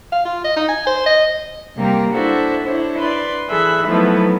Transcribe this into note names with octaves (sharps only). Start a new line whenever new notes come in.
F5
F4
D#5
D#4
G#5
C5
D#5
C3 G3 A#3 C4 G4 A#4
D4 E4 F#4 A4 C5 E5
D4 E4 C5 C#5
B4 D5 C6
E3 G#4 A4 E5 B5 F#6
F3 F#3 A3 B3 D#4 E4